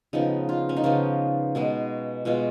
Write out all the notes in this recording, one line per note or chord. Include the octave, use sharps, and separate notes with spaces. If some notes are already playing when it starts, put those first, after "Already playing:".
C#3 F3 B3 D#4
F4
C#4
D#4
C#3 F3 B3 F4
B2 G#3 B3
B2 G#3 B3 F4